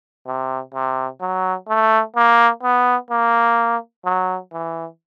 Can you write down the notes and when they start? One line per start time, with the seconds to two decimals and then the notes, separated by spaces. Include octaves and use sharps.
0.27 C3
0.74 C3
1.21 F#3
1.69 A3
2.16 A#3
2.63 B3
3.10 A#3
4.05 F#3
4.52 E3